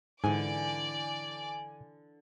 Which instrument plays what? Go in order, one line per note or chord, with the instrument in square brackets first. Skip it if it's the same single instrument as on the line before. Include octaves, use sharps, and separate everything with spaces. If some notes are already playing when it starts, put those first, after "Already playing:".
[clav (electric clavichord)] G#2 [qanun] D3 E3 [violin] D5 D6 [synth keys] G#5